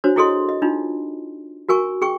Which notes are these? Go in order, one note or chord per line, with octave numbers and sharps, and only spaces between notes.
D4 F#4 C5 C#5
E4 F#4 G#4 A4 D#5 C6
D#5
D4 D#4 F4
F#4 A#4 G#5 C#6
G#4 G5 C#6